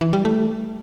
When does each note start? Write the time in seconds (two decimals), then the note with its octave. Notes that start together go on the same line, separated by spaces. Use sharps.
0.01 E3
0.13 G3
0.25 A3